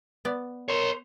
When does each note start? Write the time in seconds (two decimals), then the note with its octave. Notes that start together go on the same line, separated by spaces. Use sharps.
0.25 B3 D5
0.68 A#4 C#5 C6